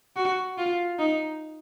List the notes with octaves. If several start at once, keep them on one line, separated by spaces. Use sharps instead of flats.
F#4
F4
D#4